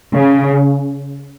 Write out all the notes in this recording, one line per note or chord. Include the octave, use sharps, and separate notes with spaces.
C#3